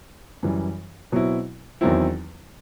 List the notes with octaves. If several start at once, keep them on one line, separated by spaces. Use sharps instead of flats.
F#2 E3 G3
B2 F#3 C4 E4
E2 D#3 F#3 C4 E4